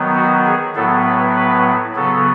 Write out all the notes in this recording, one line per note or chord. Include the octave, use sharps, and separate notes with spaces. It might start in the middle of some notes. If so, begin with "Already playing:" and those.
Already playing: D#3 F#3 B3
F#4
G#4
A2 F#3 B3 A4
B4
B4
C#3 F#3 B3 A4